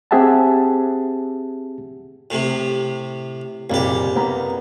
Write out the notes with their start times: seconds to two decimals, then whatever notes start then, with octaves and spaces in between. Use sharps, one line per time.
0.11 C4 G4 G#4 E5 F#5 A5
2.30 A2 C3
3.70 F#1 C2 A#2 A#3 G4
4.16 A#3 B3 A#5